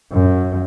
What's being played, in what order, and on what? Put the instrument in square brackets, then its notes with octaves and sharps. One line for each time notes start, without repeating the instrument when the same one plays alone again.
[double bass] F#2